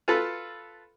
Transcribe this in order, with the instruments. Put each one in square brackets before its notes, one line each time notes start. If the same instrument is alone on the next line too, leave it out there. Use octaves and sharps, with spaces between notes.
[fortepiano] F4 A4 B4 A5 B5